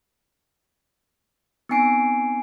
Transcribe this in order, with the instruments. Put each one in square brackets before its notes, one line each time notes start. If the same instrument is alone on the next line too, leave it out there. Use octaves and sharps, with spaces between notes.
[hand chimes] B3 C4 D#4 G#5 C7 D7